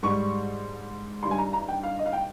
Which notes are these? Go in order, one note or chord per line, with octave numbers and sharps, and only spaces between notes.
G#2 G3 C#6
G2 D#3 G3 C6
G#5
A#5
A#5
G5
F5
D#5
F5
G5